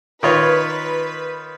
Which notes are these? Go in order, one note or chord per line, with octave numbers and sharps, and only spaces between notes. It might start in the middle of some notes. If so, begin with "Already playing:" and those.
D#3 F4 B4 C#5